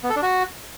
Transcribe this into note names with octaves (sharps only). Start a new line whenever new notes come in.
B3
A4
D4
F#4